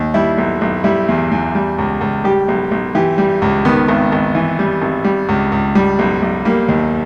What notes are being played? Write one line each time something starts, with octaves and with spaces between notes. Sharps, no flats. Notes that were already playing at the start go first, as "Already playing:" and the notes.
Already playing: D#2
G3 E4
B1
B1
G3 E4
E2
E2
G3
C#2
C#2
G3 G4
B1
B1
E3 G4
G3
C#2
D#3 B3
G#1
G#1
E3
G3
G#1
G3
C#2
C#2
G3
B1
B1
G3 A#3
D#2